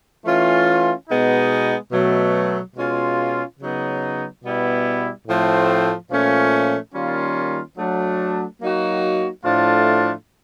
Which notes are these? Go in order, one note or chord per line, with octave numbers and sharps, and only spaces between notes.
E3 A3 C#4 F4
B2 G#3 B3 D#4
B2 F#3 A3
B2 G#3 C#4 F4
C#3 F#3 B3 D#4
B2 G3 B3 E4
A2 F3 A3 C4
A#2 F3 A3 C#4
D#3 G3 A#3 C#4 F4
F#3 A3 D4
F#3 A#3 D#4 F#4
A2 F3 A3 D4 F4